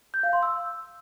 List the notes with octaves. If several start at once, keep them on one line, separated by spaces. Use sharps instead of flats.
G6
F5
C6
E6